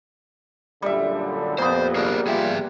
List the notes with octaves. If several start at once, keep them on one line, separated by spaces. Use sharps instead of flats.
F#2 A#2 D3 G3 E5
F2 A#2 B3 C5
G#4 A#4 D5
G3 F4 G4 G#4 D5 E5